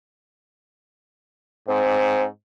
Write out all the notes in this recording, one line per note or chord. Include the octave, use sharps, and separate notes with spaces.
G#2 C4